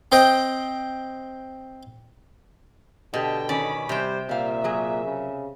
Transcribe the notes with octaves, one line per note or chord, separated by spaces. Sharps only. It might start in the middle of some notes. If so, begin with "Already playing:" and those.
C4 C5 D#5 G5
B2 D3 G4 D#5 G5 A5
D#3 C#4 D5 B5
C3 G3 C5 G5
A#2 G3 E5 F5
F#3 G#4 A#4
C#3